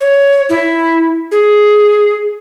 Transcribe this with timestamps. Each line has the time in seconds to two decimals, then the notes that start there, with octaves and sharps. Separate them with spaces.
0.01 C#5
0.49 E4
1.32 G#4